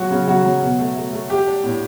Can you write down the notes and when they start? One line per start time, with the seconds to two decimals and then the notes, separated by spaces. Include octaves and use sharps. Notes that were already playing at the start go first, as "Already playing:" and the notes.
Already playing: F#3 F#4
0.11 C#3
0.28 F#3 F#4
0.44 F#3
0.62 B2
0.79 A3
0.96 A3
1.12 A3
1.30 G3 G4
1.47 D4
1.64 A2